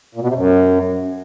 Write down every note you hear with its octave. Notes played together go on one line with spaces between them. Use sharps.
A#2
B2
C3
F#2